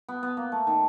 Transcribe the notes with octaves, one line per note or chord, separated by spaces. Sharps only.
B3
B3
A#3
A3
D#3